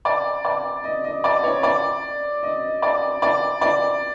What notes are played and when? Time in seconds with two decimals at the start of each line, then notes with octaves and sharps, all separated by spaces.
0.05 D5
0.45 D5
0.84 D#5
1.04 D#5
1.24 D5
1.44 C#5
1.63 D5
2.43 D#5
2.82 D5
3.22 D5
3.61 D5